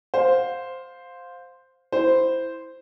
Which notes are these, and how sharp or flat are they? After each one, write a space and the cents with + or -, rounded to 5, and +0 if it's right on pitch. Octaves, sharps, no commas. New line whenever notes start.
C5 +0 F5 +20
E4 +0 C5 -5